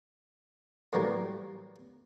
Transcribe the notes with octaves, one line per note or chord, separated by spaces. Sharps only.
A2 E3 F#3 G3 A#3